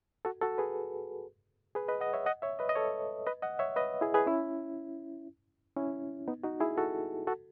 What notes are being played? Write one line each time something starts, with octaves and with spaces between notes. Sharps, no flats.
F#4 A4
F#4 A4
G#4 B4
G#4 B4
B4 D#5
D#5 F#5
C#5 E5
D#5 F#5
C#5 E5
B4 D#5
D#5
A4 C#5
B4 D#5
D#5 F#5
C#5 E5
B4 D#5
E4 G#4
G#4 B4
C#4 E4
C#4 E4
B3 D#4
D#4 F#4
E4 G#4
F#4 A4
F#4 A4